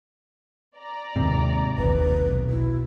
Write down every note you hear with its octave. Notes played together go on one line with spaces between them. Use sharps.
D5 A#5
D#2 G#2 C3
F1 A#1 D#2 B4
B1
E4